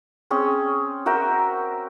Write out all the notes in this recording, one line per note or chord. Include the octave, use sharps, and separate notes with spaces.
C4 C#4 G#4
F#4 A#4 E5 G5